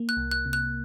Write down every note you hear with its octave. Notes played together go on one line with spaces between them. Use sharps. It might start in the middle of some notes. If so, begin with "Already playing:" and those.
Already playing: A#3
F#6
C2
F#6
C3
F#6